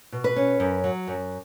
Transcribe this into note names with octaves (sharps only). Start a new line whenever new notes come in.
B2
B4
C#4
F#2
F#3
F#2